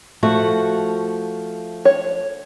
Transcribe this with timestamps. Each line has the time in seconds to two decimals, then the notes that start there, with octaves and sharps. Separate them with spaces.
0.23 F3 A3 F#4
1.85 C#5